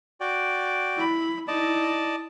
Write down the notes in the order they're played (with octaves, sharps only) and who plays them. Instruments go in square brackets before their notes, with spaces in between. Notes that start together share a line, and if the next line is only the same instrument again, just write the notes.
[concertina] F#4 D5 G5
[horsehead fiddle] E4 B5
[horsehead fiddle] D#4 E4 [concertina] D5 D#5 A5